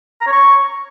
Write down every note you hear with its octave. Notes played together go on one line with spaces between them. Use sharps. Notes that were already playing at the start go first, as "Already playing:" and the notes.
A#5
C#5
C#6